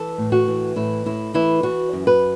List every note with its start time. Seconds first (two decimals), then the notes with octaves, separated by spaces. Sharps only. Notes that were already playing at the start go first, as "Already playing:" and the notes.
Already playing: E3 A4
0.18 A2
0.32 F#4
0.48 E3
0.76 A2 E4
1.06 A2 E4
1.34 E3 E4
1.63 E3 F#4
1.93 F#2
2.07 B4